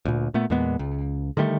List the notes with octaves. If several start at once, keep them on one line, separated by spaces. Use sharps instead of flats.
D2 A#2
A#2 A3 B3
E2 A#2 G#3 B3
C#2
D3 D#3 G3 A3